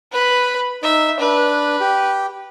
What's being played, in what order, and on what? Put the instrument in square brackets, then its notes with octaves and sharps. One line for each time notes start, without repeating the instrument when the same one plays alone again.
[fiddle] B4 B5
[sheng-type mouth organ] D#4 [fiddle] E5
[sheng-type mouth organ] D4 [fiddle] B4
[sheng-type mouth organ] G4